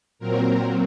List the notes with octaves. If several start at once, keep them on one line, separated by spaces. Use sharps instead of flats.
A#2 F#3 C4 A#4